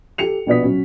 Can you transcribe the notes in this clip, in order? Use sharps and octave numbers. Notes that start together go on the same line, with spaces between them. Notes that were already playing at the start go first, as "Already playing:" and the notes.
G4 A4 C#7 F7
A#1 B2 B3 D5 D#6 B6
F#3 C#4